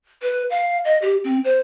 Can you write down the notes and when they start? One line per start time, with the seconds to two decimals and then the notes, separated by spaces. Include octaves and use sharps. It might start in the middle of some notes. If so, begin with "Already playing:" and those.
0.22 B4
0.50 F5
0.85 D#5
1.02 G4
1.24 C4
1.44 C5